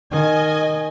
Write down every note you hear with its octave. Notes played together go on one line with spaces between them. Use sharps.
D#3 D#5 G#5